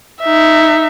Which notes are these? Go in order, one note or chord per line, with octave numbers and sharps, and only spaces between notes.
D#4 E5